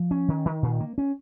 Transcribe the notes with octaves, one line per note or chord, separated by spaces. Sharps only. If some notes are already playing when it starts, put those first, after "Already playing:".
Already playing: F3
C#4
D#3
D#3
A#2
A#3
C#4